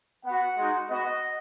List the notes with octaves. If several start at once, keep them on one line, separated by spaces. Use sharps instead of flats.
B3 F#4 F#5
G#3 D#4 F#4
B3 F#4 D#5